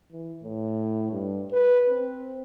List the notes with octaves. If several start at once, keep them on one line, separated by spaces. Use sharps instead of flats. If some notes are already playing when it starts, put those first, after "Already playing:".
E3
A2
G2
B4
C4